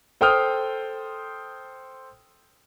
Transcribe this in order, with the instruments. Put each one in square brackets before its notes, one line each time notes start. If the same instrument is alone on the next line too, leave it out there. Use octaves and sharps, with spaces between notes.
[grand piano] A4 C5 G5 C6 D#6 F6